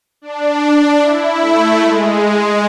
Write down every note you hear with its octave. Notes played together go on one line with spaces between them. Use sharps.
D4
E4
A3
G#3